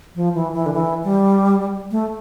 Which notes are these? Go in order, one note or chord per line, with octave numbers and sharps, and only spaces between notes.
F3
E3
E3
D3
E3
G3
A3